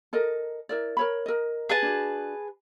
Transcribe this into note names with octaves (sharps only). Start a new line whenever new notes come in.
A4 A#4 D#5
E4 A#4 D5
A#4 C#5 B5
A#4 D#5
G#4 B4 A5
D4 F#4